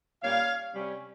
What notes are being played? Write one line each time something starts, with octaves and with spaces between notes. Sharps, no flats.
A#2 G3 A#3 C#4 C#5 F5
C3 G3 C#4